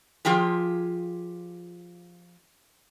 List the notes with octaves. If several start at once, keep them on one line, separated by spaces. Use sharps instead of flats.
F3 F4 G4 G#4